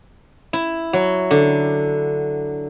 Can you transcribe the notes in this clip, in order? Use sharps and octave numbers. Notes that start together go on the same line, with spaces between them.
E4
F#3
D3